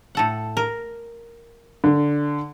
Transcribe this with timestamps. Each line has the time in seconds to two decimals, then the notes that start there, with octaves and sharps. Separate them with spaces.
0.15 A2 A4 F#5
0.57 A#4
1.84 D3